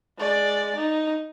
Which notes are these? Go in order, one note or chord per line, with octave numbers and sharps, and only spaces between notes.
G#3 D5
D#4